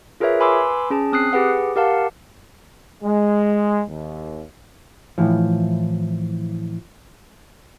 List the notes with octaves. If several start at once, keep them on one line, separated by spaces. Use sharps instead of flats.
F4 G#4 A#4 B4 C#5 E5
B4 G#5 B5 C6 D6 E6
C#4 G#4 A5
C4 D#6 F#6 C7
G4 G#4 B4 F#5
G4 A#4 F5 F#5 A5
G#3
D#2
A2 E3 F3